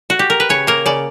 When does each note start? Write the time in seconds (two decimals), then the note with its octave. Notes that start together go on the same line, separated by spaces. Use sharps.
0.10 F#4
0.19 G4
0.30 A#4
0.40 B4
0.49 C#3 C#5
0.67 A#3 A#4
0.86 C#3 D5